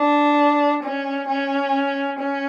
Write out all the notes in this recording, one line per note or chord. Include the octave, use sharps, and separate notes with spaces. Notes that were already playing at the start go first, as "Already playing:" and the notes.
Already playing: D4
C#4
C#4
C#4